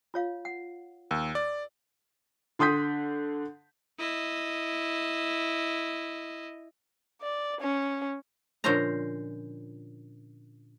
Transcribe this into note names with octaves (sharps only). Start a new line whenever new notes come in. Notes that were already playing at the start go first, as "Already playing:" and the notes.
F4 C#5 F5
F#5
D#2 A#4
D5
D3 C6 D#6 G6 B6
E4 D#5
D5
C#4
A#2 D3 F3 C#4 C5 A#5